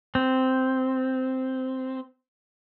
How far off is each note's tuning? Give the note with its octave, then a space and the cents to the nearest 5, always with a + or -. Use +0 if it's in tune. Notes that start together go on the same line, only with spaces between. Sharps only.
C4 -5